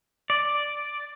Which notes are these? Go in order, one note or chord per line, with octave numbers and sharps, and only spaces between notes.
D5